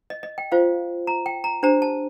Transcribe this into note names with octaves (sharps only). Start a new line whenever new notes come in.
D#5
D#5
G5
F4 C5 F5
A#5
G5
A#5
D4 G4 C5 A#5
A5